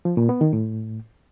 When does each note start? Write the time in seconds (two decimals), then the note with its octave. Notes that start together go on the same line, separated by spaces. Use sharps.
0.05 F3
0.17 A#2
0.29 B3
0.41 D#3
0.53 A2